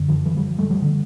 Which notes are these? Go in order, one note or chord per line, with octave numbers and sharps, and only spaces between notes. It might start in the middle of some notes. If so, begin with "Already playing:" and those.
Already playing: F#2 D3
D#3 F3
E3 F#3
F3 G3
G3 A3
F3 G3
D3